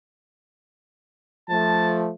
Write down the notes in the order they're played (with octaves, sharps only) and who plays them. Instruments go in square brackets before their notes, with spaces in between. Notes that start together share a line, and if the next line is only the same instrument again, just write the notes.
[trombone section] F3 A3 [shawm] A5